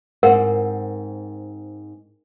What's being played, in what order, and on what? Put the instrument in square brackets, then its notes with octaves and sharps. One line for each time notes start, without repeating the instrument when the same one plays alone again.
[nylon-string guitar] G#2 C4 [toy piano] A#4 F#5